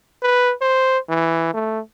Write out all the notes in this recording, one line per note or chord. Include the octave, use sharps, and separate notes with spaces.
B4
C5
E3
A3